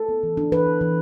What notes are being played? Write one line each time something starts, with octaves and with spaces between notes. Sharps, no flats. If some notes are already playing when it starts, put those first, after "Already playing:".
Already playing: A4
B3
E3
D4
E3 B4
E3
E3